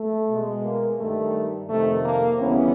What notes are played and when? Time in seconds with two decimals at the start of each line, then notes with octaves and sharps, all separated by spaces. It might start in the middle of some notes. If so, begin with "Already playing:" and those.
Already playing: A3
0.29 B2 G#3
0.64 A#3
0.98 G2 D#3 G3 A3
1.69 F2 C3 D#3 A3
2.04 A#3
2.39 D2 C#3 E3 G3 B3 C#4